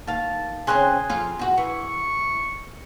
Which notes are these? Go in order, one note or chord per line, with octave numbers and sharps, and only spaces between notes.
D#2 F5 A5
C#3 C4 C#4 G#4 G#5 C6 F#6
F2 F4
E2 F#4
E3 C#6